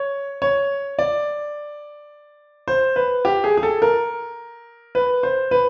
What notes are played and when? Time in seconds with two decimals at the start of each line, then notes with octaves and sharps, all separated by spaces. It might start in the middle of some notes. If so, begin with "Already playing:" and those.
Already playing: C#5
0.42 C#5
0.99 D5
2.68 C5
2.96 B4
3.25 G4
3.44 G#4
3.57 G#4
3.63 A4
3.82 A#4
4.95 B4
5.23 C5
5.51 B4